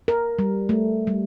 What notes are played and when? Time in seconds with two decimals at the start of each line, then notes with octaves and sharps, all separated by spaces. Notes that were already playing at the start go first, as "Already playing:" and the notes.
0.08 A#4
0.39 G3
0.69 A3
1.07 G3